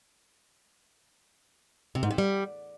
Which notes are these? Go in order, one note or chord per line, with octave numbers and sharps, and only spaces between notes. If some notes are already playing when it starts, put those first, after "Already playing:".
C3
G#2
C3
G3